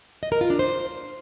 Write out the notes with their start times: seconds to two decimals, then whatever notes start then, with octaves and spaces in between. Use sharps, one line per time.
0.23 D#5
0.32 A#4
0.41 F4
0.50 D4
0.59 C5